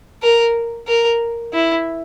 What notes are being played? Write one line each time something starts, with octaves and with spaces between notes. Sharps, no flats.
A#4
A#4
E4